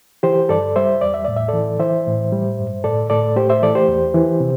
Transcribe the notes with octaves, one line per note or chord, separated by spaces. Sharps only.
E3 G4 C5
G2 A4 D5
G3 C5 E5
E2 D5
E5
A2 D5
E5
A4 D5
E3
E3 C5 E5
A2
G3
G2
A2 A4 D5
A2 A4 D5
A3 G4 C5
C5 E5
E3 A4 D5
G4 C5
E2
E3
C3